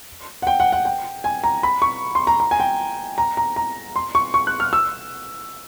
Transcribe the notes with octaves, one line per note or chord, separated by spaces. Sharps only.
F#5
G5
F#5
F#5
G5
G#5
A#5
B5
C#6
C6
A#5
A#5
G#5
G5
A#5
A#5
A#5
C6
C#6
C#6
F#6
F6
E6